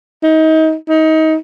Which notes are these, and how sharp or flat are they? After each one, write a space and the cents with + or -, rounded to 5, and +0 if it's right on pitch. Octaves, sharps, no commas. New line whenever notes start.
D#4 +30
D#4 +25